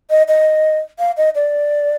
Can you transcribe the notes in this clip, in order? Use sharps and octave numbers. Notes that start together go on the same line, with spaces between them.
D#5
D#5
F5
D#5
D5